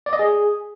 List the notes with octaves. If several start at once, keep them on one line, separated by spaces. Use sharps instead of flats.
D5
D#5
G#4